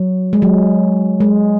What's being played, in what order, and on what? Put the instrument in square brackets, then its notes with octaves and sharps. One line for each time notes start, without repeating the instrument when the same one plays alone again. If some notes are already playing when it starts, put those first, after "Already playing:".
Already playing: [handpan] F#3
G#3
F#3
G#3